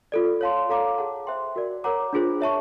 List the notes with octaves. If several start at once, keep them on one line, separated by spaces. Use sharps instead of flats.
F4 A4 D5
C#5 F5 A5 C6
A4 C#5 F5 A#5 D6
G#4 C#5 F#5 A5
C5 E5 G5 C6
F#4 A#4 D5
A#4 C#5 F#5 A#5 D6
D4 F4 G#4 C5
C#5 E5 A5 C#6